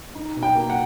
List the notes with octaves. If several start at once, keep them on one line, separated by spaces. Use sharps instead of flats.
D#4
B2
G5
A#3
F#5